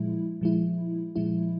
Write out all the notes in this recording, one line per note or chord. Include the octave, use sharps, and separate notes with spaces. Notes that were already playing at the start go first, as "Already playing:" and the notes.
Already playing: A#2 F3 G#3 E4
A#2 F3 G#3 E4
A#2 F3 G#3 E4